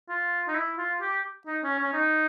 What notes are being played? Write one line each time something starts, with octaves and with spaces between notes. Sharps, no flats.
F4
D#4
E4
F4
G4
D#4
C#4
C#4
D#4